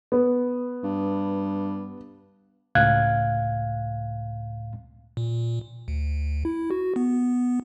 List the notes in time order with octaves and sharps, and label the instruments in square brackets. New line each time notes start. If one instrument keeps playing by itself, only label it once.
[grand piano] B3
[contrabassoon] G2
[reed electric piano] C#2 A2 F5 F#6 G#6
[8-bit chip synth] A#2
D2
E4
F#4
B3